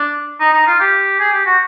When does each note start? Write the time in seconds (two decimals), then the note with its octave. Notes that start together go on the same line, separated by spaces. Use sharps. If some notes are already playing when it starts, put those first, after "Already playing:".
Already playing: D4
0.40 D#4
0.53 D#4
0.66 F4
0.80 G4
1.20 G#4
1.32 G4
1.46 F#4